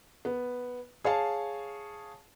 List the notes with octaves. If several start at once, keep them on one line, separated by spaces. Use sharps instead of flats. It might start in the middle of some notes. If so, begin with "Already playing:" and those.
B3
G#4 C#5 F5 A5